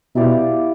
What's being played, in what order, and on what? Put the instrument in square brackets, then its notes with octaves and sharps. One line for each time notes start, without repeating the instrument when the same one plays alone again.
[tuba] B2 [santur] E4 G4 D5 F5